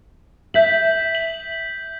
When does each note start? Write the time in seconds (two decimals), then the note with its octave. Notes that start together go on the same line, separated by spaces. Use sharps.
0.54 E5 G6 B6 F#7
1.15 F#7